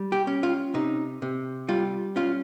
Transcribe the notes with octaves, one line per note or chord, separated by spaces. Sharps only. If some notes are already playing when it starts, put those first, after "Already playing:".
Already playing: G3
G4
C#4
F4
C3 D#4
C3
G3 F4
C#4 F4